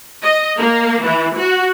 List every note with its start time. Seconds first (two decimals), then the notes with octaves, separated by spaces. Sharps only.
0.23 D#5
0.58 A#3
1.04 E3
1.38 F#4